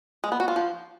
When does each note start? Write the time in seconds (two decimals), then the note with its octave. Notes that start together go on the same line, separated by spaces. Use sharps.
0.24 G#3
0.32 B3
0.40 F#4
0.48 F4
0.56 F3